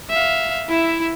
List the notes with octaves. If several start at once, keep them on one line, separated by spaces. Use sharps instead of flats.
E5 F5
E4 E5